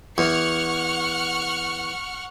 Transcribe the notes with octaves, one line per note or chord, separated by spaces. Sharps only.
E2 F#5 C#6 F6